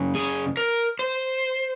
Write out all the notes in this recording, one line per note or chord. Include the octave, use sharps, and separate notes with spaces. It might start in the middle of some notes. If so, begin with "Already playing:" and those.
Already playing: F#2 C#3
G#4
A#4
C5